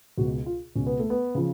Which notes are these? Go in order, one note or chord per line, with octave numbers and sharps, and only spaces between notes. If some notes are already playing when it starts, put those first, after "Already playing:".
C#2 B2 F#4
F4
C#2 B2 C#4
B3
A3
B3
C#3 F3